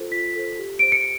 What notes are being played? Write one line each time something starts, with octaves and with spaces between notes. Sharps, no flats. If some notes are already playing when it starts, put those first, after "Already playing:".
Already playing: F4 A4 C5
F4 B6
A4 C5
G4
C5 D7
C#7